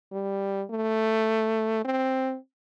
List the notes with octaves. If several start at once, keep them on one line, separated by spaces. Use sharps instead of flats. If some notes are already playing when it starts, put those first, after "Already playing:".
G3
A3
C4